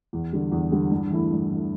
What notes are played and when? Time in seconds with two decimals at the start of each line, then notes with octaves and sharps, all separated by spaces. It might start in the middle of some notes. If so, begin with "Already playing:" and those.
0.13 E2
0.33 D3 G3
0.52 E2
0.72 D3 G3
0.91 G2
1.10 E3 A3 E4
1.31 G2
1.51 E3 A3 E4